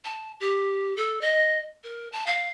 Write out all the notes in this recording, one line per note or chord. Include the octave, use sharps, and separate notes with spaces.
A5
G4
A4
D#5
A#4
A5
F5